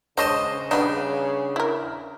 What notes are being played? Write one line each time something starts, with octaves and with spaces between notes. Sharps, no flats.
C#3 G#3 D4 C5 C#5 D#5 A5
G3 B3 D4 D#4
E4 A#4